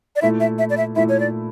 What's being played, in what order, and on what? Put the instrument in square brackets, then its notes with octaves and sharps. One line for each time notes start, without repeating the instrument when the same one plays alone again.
[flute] D5
[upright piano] A#2 A3 E4 [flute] E5
[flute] E5
E5
D5
E5
[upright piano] A#2 A3 E4 [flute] E5
[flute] C#5
D5